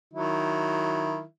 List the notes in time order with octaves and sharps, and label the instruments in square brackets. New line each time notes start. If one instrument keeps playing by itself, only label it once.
[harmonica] D#3 F#3 E4